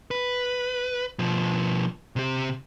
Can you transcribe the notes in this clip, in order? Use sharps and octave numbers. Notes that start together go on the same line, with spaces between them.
B4
B2 F3
C3 G4